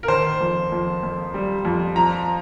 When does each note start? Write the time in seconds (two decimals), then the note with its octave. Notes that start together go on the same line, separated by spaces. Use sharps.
0.03 A#4
0.08 D#3 C5
0.41 F2
0.72 F2
1.03 F2
1.34 G3
1.65 F2
1.95 F3 A#5